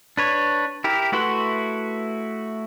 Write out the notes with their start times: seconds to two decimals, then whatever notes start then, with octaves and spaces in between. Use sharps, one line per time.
0.17 D4 B4 C#5
0.84 E4 G4 A#4
1.12 A3 E4 F#4 B4 C6